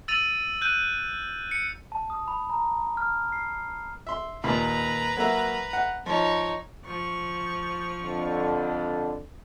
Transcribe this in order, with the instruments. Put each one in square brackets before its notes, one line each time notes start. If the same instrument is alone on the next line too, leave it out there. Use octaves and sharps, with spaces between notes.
[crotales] E6 A6 D#7 F7
F#6 G6 D#7
C#7
[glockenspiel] A5
D#6
B5
A#5
F6
C7
[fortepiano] E5 C6
[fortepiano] D#2 A#2 B5 [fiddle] B4 A#5
[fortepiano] F#3 A#3 E5
F#5
[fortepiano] F3 [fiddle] D#4 C#5
[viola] F3 C#6
[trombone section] F2 D3